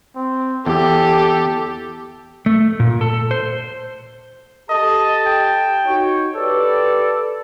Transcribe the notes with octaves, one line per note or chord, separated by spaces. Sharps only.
C4
E2 G4 A4
A3
A#2
A4
C5
G4 A4 D#5 A5
G5
D#4 F#4 C#5
G4 A4 B4 D5